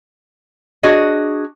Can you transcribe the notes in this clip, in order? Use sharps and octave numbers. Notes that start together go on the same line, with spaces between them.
D4 F#4 G#4 C#5 D#5